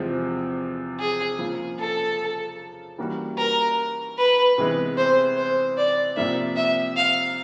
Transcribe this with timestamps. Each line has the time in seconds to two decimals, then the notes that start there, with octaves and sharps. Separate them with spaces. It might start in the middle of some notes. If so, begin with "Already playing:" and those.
Already playing: E2 C3 F3 G#3
1.00 G#4
1.39 C#3 F3 A#3 C#4 F4
1.79 A4
2.98 E3 G3 A#3 C#4 F#4
3.38 A#4
4.18 B4
4.58 C3 E3 G#3 B3
4.97 C5
5.37 C5
5.77 D5
6.16 C3 F3 A#3 E5
6.56 E5
6.96 F5